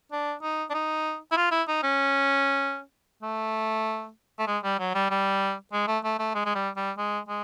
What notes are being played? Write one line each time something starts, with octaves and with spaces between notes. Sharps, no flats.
D4
D#4
D4
D#4
E4
F4
E4
D#4
C#4
A3
A3
G#3
G3
F#3
G3
G3
G#3
A3
A3
A3
G#3
G#3
G3
G3
G#3
G#3